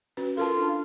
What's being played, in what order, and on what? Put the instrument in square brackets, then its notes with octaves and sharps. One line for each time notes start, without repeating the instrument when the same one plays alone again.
[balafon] C#4 F#4 B4
[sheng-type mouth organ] F4 [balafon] A4 A#4 A5
[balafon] D4